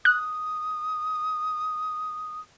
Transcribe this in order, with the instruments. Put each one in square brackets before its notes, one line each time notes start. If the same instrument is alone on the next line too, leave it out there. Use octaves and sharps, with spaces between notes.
[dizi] D#6 [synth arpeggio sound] F#6